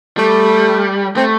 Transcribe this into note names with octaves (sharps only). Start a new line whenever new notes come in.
G3 A3
A3 C4